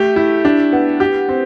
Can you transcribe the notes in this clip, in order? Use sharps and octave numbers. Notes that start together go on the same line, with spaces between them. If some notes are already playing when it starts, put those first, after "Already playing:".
Already playing: A3 G4
E4
D4
B3
G4
C4